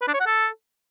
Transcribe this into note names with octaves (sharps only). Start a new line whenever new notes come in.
B4
D4
C#5
F#5
A4